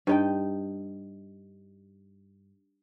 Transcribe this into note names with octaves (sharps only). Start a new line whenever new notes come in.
G2 D#4 G5